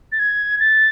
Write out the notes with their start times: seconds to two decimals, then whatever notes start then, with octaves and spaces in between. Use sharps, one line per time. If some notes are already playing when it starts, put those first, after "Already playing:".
0.12 A6
0.19 G#6
0.60 A6